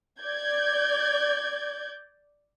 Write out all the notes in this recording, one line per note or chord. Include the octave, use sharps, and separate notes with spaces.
D5 G6 G#6